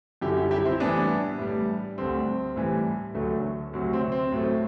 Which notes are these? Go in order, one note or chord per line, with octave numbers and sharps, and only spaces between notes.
F#2 D3 G3 E4 G4
E4 G4
E4 G4
C4 E4
A2 E3 G3 B3 D4
A2 G3
D2 D3 G3 C4
A2 E3 G3
D2 D3 F#3 A3
D2 C3 F#3
C4
C4
A2 F#3 A3